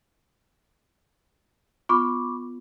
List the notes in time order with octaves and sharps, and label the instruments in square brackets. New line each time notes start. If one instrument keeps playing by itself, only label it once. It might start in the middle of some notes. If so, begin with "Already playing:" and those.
[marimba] B3 F4 [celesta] B5 C#6 D6